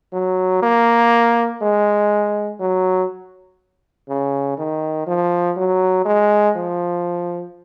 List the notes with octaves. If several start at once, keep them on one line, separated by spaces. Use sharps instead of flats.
F#3
A#3
G#3
F#3
C#3
D#3
F3
F#3
G#3
F3